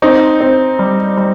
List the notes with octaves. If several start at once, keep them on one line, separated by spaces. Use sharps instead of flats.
C4 D#4
C4
G3
G3